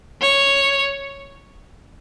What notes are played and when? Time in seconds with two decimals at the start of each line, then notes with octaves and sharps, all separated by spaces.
0.21 C#5